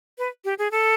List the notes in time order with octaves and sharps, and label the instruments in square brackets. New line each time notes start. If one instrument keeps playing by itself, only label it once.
[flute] B4
G4
G#4
A4